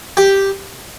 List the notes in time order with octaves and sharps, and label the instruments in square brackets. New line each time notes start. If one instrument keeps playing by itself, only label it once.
[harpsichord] G4